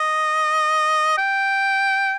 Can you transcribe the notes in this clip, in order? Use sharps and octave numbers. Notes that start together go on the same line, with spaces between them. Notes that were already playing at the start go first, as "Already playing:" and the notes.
Already playing: D#5
G5